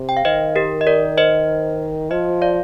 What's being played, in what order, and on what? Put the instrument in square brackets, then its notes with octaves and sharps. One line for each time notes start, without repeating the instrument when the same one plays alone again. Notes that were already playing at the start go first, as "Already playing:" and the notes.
Already playing: [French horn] C3
[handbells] G5
F5
[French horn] D#3 [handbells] C5 D#5
[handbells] G4 A#4
D#5
A#4 D5
C5 D#5
[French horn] F3 [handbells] C5 D#5
[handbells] D5 F5